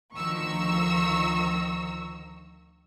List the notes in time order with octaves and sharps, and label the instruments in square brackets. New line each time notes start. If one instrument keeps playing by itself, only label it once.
[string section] D2 D#3 F3 A#5 C#6 E6